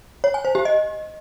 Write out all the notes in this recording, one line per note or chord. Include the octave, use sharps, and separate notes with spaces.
C#5
G#5
C5
G4
D#5